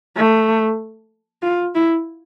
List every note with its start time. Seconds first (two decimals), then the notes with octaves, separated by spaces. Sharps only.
0.16 A3
1.43 F4
1.75 E4